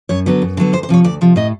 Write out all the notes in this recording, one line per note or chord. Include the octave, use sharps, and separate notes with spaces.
F#2 C#5
D3 F#3 B3
F#2
D3 F#3 B3
D2 C5
C5
C3 F3 C#5
D2 D5
C3 F3
A2 D#5